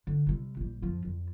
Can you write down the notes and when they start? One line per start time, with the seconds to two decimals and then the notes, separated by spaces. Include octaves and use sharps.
0.07 D3
0.27 C3 G3
0.57 A#1 G3
0.82 F2 F3
1.05 F2